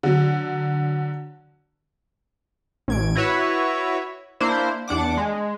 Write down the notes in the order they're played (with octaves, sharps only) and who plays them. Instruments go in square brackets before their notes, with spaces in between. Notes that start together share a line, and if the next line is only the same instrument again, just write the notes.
[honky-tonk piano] D3 F#3
[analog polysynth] A1 G#6 D7
E4 F#4 B4 C#5 E5
A#3 D4 E4 C5
E2 D4 F#5 D6
G#3